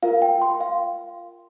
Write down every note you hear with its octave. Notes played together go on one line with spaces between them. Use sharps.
F4 A#4 F5
G5
C6
F5